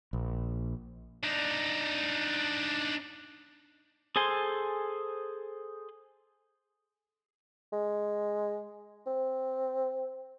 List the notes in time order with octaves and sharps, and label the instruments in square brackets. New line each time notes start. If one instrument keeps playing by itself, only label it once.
[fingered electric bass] A#1
[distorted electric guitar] D4 D#4
[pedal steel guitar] G#4 A4 C5 G#5 C6
[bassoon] G#3
C4